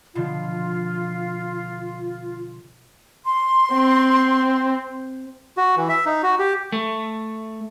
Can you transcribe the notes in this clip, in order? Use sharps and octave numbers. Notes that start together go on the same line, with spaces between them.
B2 D3 F3 F4
C6
C4
F#4
E3
E5
D#4
F#4
G4
A3